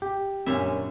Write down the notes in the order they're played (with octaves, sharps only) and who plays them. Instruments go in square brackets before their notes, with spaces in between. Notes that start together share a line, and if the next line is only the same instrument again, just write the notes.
[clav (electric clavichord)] G4
[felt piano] F#2 D3 [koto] A#2 G3 E5 [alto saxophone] C#4